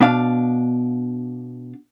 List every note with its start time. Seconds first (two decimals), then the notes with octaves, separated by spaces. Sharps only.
0.01 B2 D4 D5 F5